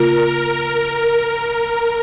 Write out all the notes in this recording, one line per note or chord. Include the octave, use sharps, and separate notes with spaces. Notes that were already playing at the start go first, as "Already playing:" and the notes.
Already playing: C#3 A#3 F4 A#4
A#4